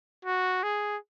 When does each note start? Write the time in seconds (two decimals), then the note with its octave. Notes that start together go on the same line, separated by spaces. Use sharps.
0.25 F#4
0.63 G#4